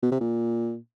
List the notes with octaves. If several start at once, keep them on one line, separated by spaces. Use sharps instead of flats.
B2
C3
A#2